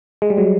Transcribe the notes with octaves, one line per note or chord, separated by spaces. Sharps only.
G#3
G3
F#3 G#3